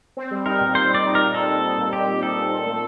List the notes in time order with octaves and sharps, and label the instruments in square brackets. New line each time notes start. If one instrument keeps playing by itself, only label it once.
[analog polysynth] C4
G3
[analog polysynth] D#4 [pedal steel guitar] A#4
[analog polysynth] A#2
[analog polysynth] C4 [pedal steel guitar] C5
[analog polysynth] G3
[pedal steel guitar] D5
[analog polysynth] D#4
[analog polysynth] A#2 [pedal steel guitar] A#4
[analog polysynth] C4 [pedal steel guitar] A4
[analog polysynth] G3
D#4
A#2
[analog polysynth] C4 [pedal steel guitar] G4
[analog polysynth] G3
[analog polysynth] D#4 [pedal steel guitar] A4
[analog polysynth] A#2
C4
A3